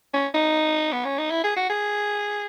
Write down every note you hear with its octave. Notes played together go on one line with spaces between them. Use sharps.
C#4
D#4
B3
C#4
D#4
E4
G#4
F#4
G#4